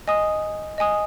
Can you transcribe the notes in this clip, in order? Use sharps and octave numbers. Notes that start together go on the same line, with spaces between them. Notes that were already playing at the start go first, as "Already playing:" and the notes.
D#5 G#5 D#6
D#5 G#5 D#6